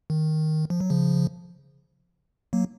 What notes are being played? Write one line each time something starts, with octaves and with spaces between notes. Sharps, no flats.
D#3
F3
F#3
C#3 F3
F#3 A#3